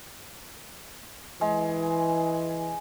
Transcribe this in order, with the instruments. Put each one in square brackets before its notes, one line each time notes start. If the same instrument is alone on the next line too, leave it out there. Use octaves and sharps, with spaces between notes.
[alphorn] E3 [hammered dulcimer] G#3